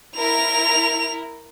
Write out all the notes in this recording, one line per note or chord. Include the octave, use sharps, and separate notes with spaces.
E4 A#4 F7